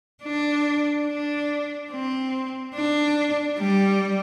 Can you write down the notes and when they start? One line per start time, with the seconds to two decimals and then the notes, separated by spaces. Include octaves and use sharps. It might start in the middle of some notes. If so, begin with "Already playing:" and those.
0.24 D4
1.07 D4
1.91 C4
2.75 D4
3.58 G3